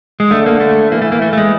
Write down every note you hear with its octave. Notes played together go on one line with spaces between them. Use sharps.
G#3
D3 A3
A#3
A3
E3 A#3
A3
A#3
A3
A3
G#3